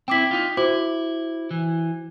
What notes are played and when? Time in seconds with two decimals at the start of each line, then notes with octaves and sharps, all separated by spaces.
0.08 C4 E4 G5 D6 B6
0.31 D#4 F4
0.57 E4 F#4 C5 D6
1.51 E3